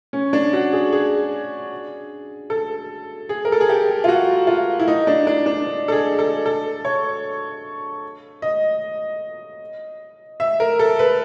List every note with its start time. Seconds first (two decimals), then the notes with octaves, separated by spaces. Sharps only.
0.13 C#4
0.33 D4
0.53 F#4
0.73 G#4
0.93 G#4
2.50 A4
3.29 G#4
3.45 A#4
3.52 A4
3.61 G#4
3.69 G4
4.04 F4
4.08 F#4
4.47 F4
4.80 E4
4.88 D#4
5.07 D4
5.27 D4
5.46 D4
5.88 A4
5.92 G#4
6.19 A4
6.46 A4
6.85 C#5
8.42 D#5
10.40 E5
10.60 A#4
10.79 A4
10.99 B4